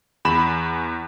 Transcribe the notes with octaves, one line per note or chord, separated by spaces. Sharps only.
E2 B5 E7